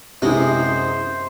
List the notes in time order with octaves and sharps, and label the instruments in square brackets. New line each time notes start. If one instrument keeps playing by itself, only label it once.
[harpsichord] F#2 G#3 B3 [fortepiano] C3 E4 [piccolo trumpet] C5